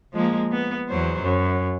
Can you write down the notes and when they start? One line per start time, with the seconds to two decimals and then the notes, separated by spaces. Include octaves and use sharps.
0.13 F3 G#3 A#3
0.51 B3
0.89 E2 F#3 C5
1.23 F#2